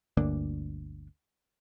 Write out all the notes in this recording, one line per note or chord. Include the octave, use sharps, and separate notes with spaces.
G1 D2 A#3 D4